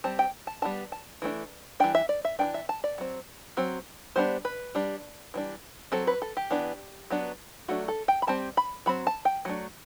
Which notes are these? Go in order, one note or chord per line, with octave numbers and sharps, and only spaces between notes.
G3 C4 A5
G5
A5
G3 B3 D4 A5
A5
E3 A3 D4
E3 G3 D4 G5
E5
D5
E5
E3 A3 D4 G5
E5
A5
D5
F#3 C4
F#3 C4
G3 B3 D4 C5
B4
G3 D4
E3 G3 D4
F#3 C4 A4
B4
A4
G4
E3 B3 D4
F#3 B3 D4
F#3 A3 D4 F#4
A4
G5
B5
G3 C4 A5
B5
F#3 C4 B5
A5
G5
F#3 A3 D4